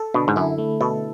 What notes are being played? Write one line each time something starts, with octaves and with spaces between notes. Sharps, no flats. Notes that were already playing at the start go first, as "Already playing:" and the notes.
Already playing: A4
B2 D3
G#2
F#2 E4
A3
B2 A4